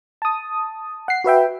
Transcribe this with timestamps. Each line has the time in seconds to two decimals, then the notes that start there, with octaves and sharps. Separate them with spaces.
0.22 A5 D#6
1.08 F#5 C7
1.24 F#4 B4 E5 G5